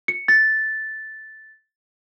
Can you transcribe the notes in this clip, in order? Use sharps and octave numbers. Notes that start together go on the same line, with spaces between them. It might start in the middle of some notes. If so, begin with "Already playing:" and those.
C#7
A6